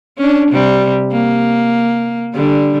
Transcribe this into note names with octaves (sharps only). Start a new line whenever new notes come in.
C#4 D4
C3 G3
A#3
D3 G3